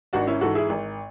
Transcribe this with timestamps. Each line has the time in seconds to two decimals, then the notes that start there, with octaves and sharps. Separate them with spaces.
0.13 G#1 D4 F#4
0.27 C#4 E4
0.41 G#2 E3 F#4 A4
0.55 E4 G#4
0.69 G#1